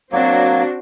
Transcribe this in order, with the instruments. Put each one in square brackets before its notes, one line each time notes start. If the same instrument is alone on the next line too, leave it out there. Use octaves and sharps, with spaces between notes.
[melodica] F#3 A#3 [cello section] C4 D4 F#4